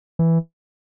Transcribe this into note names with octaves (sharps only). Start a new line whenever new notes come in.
E3